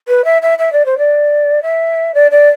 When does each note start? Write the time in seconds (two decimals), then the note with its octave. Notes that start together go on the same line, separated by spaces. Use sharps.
0.08 B4
0.25 E5
0.42 E5
0.59 E5
0.73 D5
0.86 C5
0.98 D5
1.63 E5
2.14 D5
2.31 D5